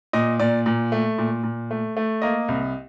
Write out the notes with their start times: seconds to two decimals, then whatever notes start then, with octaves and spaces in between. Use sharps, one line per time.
0.13 A#2 D#5
0.39 A#2 D5
0.66 A#2
0.92 A3
1.18 A#2
1.43 A#2
1.71 A3
1.97 A3
2.22 A#3 D#5
2.48 C2